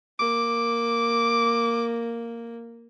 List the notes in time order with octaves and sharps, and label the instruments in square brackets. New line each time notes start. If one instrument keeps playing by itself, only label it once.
[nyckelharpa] A#3 [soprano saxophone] D6